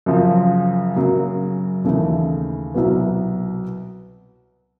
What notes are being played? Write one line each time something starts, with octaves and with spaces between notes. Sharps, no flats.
F#2 C#3 F3
F#2 C#3 F#3 A#3
D#2 C#3 E3 A3
C2 B2 F#3 B3